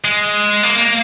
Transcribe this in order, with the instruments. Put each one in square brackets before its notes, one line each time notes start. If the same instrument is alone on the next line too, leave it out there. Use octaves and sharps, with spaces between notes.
[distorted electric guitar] G#3
A#3
A#3